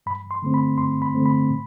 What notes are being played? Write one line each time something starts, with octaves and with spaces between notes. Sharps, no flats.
G2 B5
C6
D3 A3 C4
B5
G2 C6
B5
D3 A3 C4
B5
A2